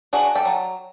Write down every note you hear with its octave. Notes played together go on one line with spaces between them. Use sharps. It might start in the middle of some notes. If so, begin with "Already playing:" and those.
D4 F#4 G#4
G4 A4
F#3